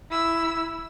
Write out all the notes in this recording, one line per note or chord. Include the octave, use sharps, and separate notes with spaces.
E4 E6